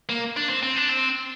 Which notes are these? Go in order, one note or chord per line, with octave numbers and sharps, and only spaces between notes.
A#3
D4
C4
C4
D4
C4